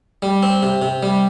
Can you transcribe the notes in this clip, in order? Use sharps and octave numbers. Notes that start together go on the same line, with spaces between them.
G3
C4
C3
C3
G3